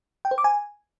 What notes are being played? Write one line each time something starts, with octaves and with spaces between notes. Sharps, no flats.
G5
C5
D6
G#5